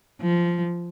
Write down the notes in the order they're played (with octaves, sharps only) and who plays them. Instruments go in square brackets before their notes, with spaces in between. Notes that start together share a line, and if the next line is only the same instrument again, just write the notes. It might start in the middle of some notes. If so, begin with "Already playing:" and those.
[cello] F3